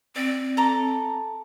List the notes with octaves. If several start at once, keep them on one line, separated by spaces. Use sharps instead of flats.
C4 D5
A4 A#5 D6